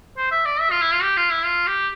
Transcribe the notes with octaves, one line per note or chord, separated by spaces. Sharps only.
C5
E5
D5
E5
F4
E4
F4
G4
F4
E4
F4
G4